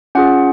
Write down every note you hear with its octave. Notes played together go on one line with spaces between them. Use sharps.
C#4 F4 G#4 F#5